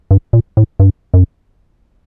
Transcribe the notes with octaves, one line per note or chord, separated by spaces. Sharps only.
G2
A#2
A2
G2
F#2